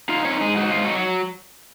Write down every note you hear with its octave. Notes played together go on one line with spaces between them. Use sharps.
D#4 F4 F5
C4 C#4 C#5
G#2 G#3 G#4
D#4 F#4
G#2 F4
F#3 F#4